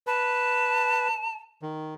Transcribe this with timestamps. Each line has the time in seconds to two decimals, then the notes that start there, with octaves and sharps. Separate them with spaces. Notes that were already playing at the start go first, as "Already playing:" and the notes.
0.07 B4 A5
1.62 D#3